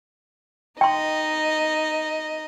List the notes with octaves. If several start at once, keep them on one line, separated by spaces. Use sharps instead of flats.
D#4 D#5 G5 C6